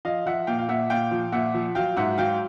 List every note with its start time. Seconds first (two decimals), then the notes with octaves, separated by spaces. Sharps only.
0.05 F3 D#5 F5
0.26 F3 E5 F#5
0.47 A#2 F5 G5
0.59 F5
0.68 A#2 E5 F#5
0.90 A#2 F5 G5
1.11 F3
1.32 A#2 E5 F#5
1.54 F3
1.75 F#3 F5 G5
1.96 G#2 E5 F#5
2.18 F#3 F5 G5